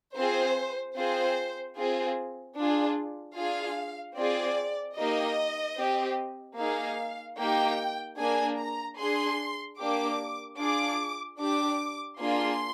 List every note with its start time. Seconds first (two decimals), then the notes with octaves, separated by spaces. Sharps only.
0.16 C4 F4 G#4 C5
0.96 C4 F4 G#4 C5
1.76 C4 F4 G#4
2.57 D4 F4 G#4
3.37 D4 F4 G#4 F5
4.17 C4 F4 G#4 D5
4.97 A#3 D#4 G4 D#5
5.78 C4 G4
6.58 A#3 D#4 G#4 F5
7.38 A#3 D#4 G4 G5
8.18 A#3 D4 G#4 G#5
8.58 A#5
8.98 D4 G#4 C6
9.79 A#3 D4 G4 D6
10.59 D4 F4 G#4 D6
11.39 D4 G4 D6
12.19 A#3 D4 F4 G#4 C6